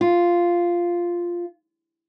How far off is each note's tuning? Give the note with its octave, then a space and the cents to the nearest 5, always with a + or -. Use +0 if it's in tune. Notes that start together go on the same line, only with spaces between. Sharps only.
F4 -5